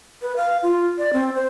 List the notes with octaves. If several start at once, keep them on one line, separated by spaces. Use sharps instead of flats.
B4
F5
F4
D5
C4
C5